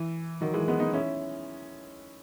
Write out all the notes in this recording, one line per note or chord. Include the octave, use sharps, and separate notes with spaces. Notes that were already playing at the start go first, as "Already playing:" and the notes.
Already playing: E3
D#3 F#3
E3 G#3
G#3 B3
B3 D#4
C#4 E4